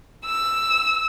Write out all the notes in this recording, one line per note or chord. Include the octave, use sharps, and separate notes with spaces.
E6